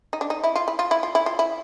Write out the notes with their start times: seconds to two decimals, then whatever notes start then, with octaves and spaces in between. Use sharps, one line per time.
0.13 D#4
0.21 D4
0.30 D#4
0.44 E4
0.56 F4
0.68 E4
0.79 F4
0.91 E4
1.03 F4
1.15 E4
1.26 F4
1.39 E4